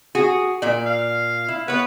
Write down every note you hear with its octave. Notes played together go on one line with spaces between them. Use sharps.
F#4 G#4
A#2 D5
F5
E4
B3 B4 C#5